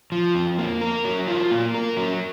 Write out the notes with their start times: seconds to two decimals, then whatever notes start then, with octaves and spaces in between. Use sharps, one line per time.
0.12 F3
0.35 F2
0.58 A#3
0.81 A#4
1.05 F#3
1.28 F4
1.51 A#3
1.74 A#4
1.97 F#3